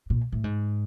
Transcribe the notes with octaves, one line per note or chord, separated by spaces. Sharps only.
A#2
A2
G#2